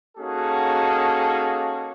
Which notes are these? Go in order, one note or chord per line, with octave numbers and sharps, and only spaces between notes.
A#3 C#4 D#4 F#4 G#4 A4